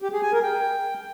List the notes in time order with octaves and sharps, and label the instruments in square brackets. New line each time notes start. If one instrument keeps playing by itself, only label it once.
[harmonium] G4
G#4
G#5
A#4
G5